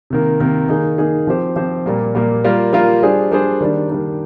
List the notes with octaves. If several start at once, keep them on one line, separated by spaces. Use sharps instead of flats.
C3 D#3 A#3
C3 D#3 A#3
D#3 A#3 D#4 G#4
D#3 A#3 D#4 G#4
F3 C4 G4 C5
F3 C4 G4 C5
A#2 G3 A#3
A#2 G3 A#3
G3 A#3 F4 A#4
G3 A#3 F4 A#4
G3 D4 G#4 C5
G3 D4 G#4 C5
D#3 G3 A#3 D4
D#3 G3 A#3 D4